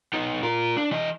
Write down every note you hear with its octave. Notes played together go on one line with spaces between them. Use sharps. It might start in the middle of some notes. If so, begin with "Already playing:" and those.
B3 D#4
F4 A#4
D4
E3 D#5